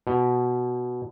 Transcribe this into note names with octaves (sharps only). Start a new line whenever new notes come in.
B2